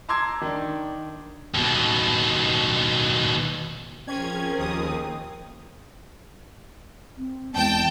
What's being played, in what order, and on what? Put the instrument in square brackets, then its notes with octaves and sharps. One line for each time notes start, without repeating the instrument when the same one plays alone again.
[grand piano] A5 A#5 C6 D6 E6 G#6
D#3 D4
[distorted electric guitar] D#2 B2
[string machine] F3 G#4 A#4 [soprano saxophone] C4 [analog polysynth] C#4 [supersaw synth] G#6
[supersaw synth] D#2 D#6
[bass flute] C4
[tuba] E2 [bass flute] G#3 [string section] G5 A5